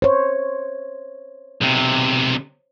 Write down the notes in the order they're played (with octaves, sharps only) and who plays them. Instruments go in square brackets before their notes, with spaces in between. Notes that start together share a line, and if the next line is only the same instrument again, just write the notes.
[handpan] C5 C#5
[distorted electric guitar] B1 C3